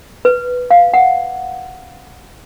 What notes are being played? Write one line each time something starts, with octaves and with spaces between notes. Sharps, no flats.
B4
F5
F#5